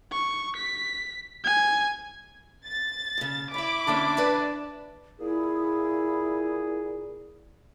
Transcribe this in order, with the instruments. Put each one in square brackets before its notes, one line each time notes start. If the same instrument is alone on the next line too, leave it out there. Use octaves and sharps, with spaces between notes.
[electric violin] C#6
B6
G#5
[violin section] A6
[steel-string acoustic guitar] D#2 C#3
[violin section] E4 B5 D6 [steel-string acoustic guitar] C#5 E5
[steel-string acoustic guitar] D3 A#3 C#4 [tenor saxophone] D4
[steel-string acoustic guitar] B4 D5 A5
[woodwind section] A#2 G#4 [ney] E4